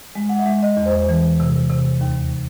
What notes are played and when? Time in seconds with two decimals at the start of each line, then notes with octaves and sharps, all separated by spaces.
0.15 G#3
0.29 F#5
0.39 E5
0.46 G#3
0.63 D#5
0.77 E2
0.86 C5
1.09 E3
1.40 C3
1.70 C3
2.01 D#2